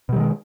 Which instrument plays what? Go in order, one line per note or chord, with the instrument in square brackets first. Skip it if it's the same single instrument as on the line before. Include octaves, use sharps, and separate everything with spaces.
[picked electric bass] B2
G3
D#3
G#3